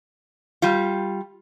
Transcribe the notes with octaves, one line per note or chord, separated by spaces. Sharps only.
G3 F4